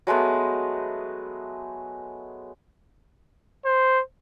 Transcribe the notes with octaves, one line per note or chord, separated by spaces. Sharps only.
F#3 G#3 A3 B3
C5